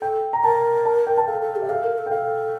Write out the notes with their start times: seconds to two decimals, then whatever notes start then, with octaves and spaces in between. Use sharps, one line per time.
0.01 A4 G5
0.33 A#5
0.44 A#4 A5
0.85 A5
1.07 G5
1.18 A5
1.27 A4 F5
1.41 A4
1.56 G4
1.62 E5
1.69 A4 F5
1.84 A#4
1.98 A4
2.06 G5
2.11 A4 F5